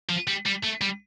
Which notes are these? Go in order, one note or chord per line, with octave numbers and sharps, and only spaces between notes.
F3
G3
G3
A3
G3